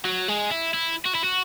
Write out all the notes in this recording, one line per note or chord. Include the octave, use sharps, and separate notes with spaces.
F#3
G#3
E4
E4
F#4
E4
F#4